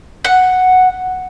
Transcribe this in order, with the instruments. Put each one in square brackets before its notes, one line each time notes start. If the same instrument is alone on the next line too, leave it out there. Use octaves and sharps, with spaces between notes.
[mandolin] F#5